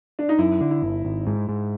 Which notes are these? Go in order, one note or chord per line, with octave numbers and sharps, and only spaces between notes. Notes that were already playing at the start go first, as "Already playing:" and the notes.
D4
D#4
F#2 E4
D3
E4
G1
G#1
G#2
G#2